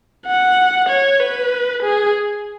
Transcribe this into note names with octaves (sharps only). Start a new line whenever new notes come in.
F#5
C#5
B4
G#4